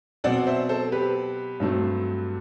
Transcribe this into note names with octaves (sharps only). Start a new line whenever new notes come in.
B2 F#3 C4 D5 F#5
C5 E5
A4 C5
G4 B4
G2 F#3 A3 C4